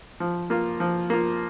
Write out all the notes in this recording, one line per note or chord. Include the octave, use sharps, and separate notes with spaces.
F3
A#3 F4
F3
A#3 F4